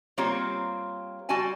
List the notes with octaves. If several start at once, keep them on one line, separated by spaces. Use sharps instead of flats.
G3 A#3 C4 F4 G4 C#5
G3 F#4 D5 G#5 A5